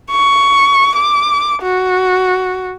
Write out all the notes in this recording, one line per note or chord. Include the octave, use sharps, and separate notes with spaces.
C#6
D6
F#4